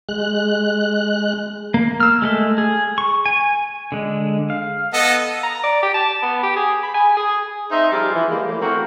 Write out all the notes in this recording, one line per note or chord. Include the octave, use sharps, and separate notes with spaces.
G#3 F#6
A#3
E6 F6
G#3 A3 A4
G#4
C#6
G#5
D3 G#3
F5
B3 A4 D#5
A#5
D5
G4
A5
B3
G4
G#4
B5
G#5
G#4
C4 D#4 C5 D#5 E5
F3 G3 F4 G#4
E3
E3 G3 G#3 A#3
A2 E3
A#3 C4 E4 F#4 A4 A#4